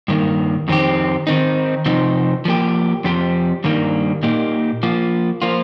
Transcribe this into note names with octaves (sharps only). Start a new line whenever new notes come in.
G2 D#3 A#3
F2 D#3 C4 G4
D#3 C4 D#4
C3 F3 C4 D#4
F3 A#3 G4
F2 F3 C4 G4
G2 D#3 G3 A#3
A#2 A#3 D#4 G4
F3 A#3 F4
F3 A#3 F4